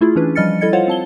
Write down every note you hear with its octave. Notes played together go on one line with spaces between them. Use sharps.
A3 E4 F4 G#4
E3 C#4 D4 B4
F3 G3 D#5 F6 A6 C#7
G3 E4 A4 D#5 G#6 C#7
F4 C5 C#5 F5 F#5
C4 A5 G7